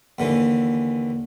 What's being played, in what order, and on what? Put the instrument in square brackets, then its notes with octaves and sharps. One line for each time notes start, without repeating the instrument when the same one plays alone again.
[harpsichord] D#2 D3 E3